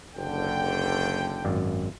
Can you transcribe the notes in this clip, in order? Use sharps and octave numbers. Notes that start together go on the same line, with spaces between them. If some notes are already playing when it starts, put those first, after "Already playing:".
F#1 D3 G5
G#1 F#2 D5